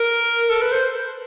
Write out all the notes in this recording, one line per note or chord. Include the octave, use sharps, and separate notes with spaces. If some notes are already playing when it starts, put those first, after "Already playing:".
Already playing: A#4
A4
B4
C5